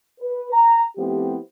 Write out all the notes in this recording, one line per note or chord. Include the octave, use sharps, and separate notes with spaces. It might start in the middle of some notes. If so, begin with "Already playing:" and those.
B4
A#5
F3 A3 B3 C4 E4 G4